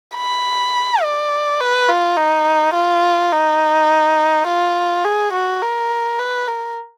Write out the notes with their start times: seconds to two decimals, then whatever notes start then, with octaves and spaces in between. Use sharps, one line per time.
0.16 B5
1.03 D5
1.60 B4
1.89 F4
2.17 D#4
2.74 F4
3.32 D#4
4.47 F4
5.04 G#4
5.33 F#4
5.62 A#4
6.19 B4
6.48 A#4